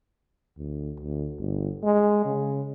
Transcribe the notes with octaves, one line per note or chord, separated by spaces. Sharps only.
D2
D2
G1
G#3
C#3